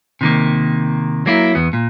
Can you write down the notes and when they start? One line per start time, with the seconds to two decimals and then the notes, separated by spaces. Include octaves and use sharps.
0.21 C3 D#3 A#3
1.26 F#3 A#3 E4
1.55 E2 B3
1.73 A#2